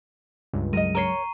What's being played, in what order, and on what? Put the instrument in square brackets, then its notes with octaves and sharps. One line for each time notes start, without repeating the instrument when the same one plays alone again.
[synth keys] C#2 G2
[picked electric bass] F#3 G#3 [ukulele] A#4 D#5 [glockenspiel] D#7
[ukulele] A#4 C#5 [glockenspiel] A#5 C#6 C7